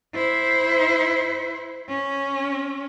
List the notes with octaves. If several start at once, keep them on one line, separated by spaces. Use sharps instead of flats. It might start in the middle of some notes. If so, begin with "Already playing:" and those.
E4 C5
C#4